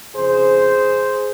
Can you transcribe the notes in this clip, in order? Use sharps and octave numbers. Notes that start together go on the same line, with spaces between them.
F2 C#3 G#4 C5